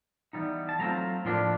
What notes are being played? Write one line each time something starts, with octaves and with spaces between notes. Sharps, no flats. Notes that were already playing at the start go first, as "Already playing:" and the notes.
E3 G3 B3 D#4
A5
F#3 A3 C4 F4 A#5
A2 F3 A#3 D4 F4